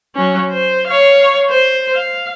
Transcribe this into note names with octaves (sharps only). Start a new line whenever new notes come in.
F#3 C#4
C5
C#5 F5
C5
F5